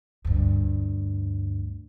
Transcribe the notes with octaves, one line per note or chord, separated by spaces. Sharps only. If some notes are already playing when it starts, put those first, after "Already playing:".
D2 G2